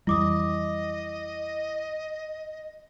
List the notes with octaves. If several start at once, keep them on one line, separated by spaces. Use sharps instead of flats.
F2 E3 G3 E4 D#5 D6 D#6